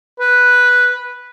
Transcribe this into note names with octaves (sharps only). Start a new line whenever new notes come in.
B4